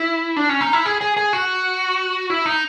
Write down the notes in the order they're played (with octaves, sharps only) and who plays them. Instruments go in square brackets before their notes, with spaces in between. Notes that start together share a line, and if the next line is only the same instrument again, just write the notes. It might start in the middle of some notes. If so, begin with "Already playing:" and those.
Already playing: [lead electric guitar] E4
D4
C#4
D#4
E4
G#4
G#4
G#4
F#4
E4
D#4